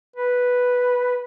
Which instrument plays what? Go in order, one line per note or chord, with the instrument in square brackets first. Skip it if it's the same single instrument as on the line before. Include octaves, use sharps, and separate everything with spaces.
[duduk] B4